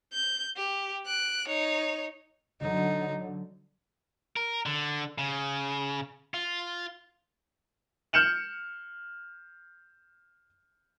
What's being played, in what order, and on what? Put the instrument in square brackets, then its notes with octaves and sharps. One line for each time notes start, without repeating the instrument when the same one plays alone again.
[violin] G6
G4
F#6 D7
D#4 C#5
[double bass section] D3 F#3 [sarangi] D#4
[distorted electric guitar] A#4
D3
C#3
F4
[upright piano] F6 G6 C#7 E7 F#7